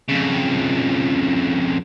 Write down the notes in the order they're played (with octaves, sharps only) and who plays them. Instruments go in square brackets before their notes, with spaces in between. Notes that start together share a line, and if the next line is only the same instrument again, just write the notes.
[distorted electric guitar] F2 C#3